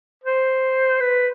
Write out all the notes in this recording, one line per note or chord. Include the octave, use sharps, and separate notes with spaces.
C5
B4